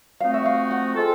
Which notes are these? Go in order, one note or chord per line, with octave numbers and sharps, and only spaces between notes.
F3 A3 C4 D#4 F#4 F5
E5
F5
F#5
G#3 C4 F4 A4